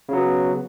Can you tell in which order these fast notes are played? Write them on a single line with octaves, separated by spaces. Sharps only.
C#3 F#3 B3